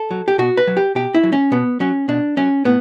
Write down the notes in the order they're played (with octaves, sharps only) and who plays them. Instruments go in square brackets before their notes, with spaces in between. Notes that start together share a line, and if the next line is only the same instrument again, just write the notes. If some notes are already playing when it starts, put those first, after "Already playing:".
Already playing: [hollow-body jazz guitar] A4
F#3
G4
B2 F#4
B4
F#3
G4
B2 G4
E4
F#3
C#4
B2 B3
F#3 C#4
B2 D4
F#3 C#4
A2 B3